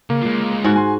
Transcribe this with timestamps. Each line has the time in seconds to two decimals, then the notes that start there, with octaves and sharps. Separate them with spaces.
0.10 C#3 A#3
0.21 G#3 F4
0.64 G#2 F#4
0.76 G#5 C6